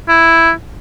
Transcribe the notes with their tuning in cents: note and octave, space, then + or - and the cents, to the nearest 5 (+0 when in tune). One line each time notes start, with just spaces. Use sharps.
E4 +0